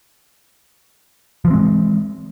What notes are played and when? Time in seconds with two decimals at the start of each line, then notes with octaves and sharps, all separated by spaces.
1.45 F3
1.48 E3
1.50 C4
1.53 G#3